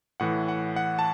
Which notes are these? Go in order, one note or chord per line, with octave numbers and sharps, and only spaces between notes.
A2 E3 F#5
F#5
F#5
A5